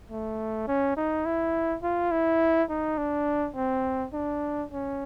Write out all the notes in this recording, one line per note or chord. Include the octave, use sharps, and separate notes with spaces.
A3
C#4
D#4
E4
F4
E4
D#4
D4
C4
D4
C#4